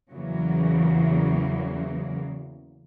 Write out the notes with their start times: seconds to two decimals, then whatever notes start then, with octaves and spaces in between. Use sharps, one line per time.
0.12 E2 C#3 E3 F#3 A#3